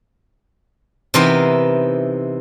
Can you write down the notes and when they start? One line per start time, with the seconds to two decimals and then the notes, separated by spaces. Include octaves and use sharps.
1.14 C3 E3 B3 C4 D#4 A#4